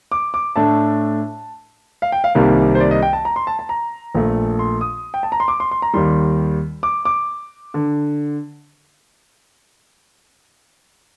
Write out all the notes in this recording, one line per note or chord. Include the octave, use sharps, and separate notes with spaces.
D6
D6
A2 A3 D4 A5
F5
G5
F5
C2 C3 D#3 G3 A#3 F5
C5
D5
D#5
G5
A5
A#5
C6
A5
A5
A#5
A#1 A#2 A3
C6
D#6
G5
A5
A#5
C6
D6
C6
C6
A#5
D#2 D#3 G3 C6
D6
D6
D3